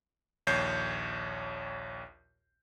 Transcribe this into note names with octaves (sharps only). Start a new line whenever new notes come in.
A#1 D#2 C#5 G6 C7